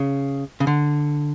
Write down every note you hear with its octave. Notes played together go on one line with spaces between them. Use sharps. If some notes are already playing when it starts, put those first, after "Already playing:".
Already playing: C#3
C#3
D3